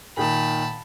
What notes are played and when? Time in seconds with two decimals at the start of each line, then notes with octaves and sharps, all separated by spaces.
0.17 A#2 D#3 A5 B5